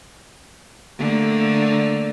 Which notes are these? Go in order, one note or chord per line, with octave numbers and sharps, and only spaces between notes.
D3 A3 A#3